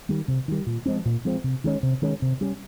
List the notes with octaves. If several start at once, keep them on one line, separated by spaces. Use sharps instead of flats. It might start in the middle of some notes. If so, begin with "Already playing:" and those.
D#3 G3
C3
D#3 G3
A#2
F3 G#3 C4
A#2
F3 G#3 C4
C3
D#3 G#3 C#4
C3
D#3 G#3 C#4
C3
G3 C#4